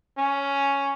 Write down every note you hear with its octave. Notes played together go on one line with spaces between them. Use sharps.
C#4